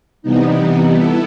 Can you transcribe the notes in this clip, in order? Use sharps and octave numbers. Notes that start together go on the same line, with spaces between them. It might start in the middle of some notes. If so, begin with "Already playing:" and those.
C3 E3 G3 B3 D#4
B3 E4 A4